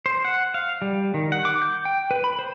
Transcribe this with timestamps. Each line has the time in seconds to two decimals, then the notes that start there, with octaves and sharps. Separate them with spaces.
0.06 C5
0.25 F#5
0.54 F5
0.82 G3
1.14 D#3
1.32 F#5
1.45 D6
1.62 G6
1.85 G5
2.11 B4
2.24 B5
2.39 C5